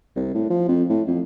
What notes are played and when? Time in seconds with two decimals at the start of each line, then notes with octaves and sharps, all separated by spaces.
0.16 C2
0.34 A2
0.50 F3
0.68 F2
0.89 A2
1.07 F2